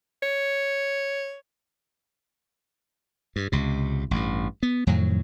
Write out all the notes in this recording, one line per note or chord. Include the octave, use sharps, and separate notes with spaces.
C#5
G2
C#2 C3
A1 G2
B3
F2 A2 D#3 F#3